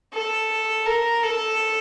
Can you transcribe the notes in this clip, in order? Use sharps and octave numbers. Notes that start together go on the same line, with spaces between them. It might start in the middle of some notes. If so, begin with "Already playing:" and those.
A4
A#4
A4